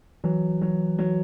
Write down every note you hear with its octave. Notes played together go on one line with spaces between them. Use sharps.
E3 F#3
F#3
F#3